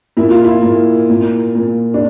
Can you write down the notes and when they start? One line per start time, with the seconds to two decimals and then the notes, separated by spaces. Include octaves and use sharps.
0.17 A#2 E4
0.31 F4
0.44 E4
0.63 A#2
1.10 A#2
1.55 A#2
1.94 D4